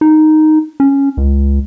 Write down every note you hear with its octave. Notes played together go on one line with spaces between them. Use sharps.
D#4
C#4
C#2